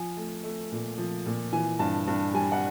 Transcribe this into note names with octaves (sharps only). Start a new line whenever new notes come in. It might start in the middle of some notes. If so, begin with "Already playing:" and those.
Already playing: F3 G#5
A3
A3
A#2
F3
A#2
E3 G#5
G2 A5
G2
G3 G#5
F#5